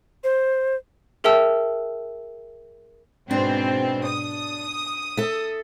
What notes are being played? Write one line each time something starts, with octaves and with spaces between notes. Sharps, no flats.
C5
G#4 A#4 E5 G5 A5 E6
G#2 B2 C4 D4
D#6
A4 E5